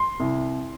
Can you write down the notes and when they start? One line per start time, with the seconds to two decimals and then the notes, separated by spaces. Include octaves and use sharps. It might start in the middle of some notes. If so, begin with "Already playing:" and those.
Already playing: C6
0.20 C2